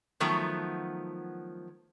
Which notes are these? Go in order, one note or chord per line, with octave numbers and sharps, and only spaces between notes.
D#3 F3 F#3 A3 B3